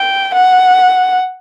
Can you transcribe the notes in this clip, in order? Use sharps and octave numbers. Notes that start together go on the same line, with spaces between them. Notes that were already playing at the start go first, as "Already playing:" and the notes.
Already playing: G5
F#5